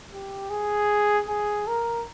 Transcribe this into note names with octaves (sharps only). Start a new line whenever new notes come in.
G4
G#4
G#4
A#4